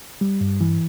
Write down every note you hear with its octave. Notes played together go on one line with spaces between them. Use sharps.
G3
G2
E3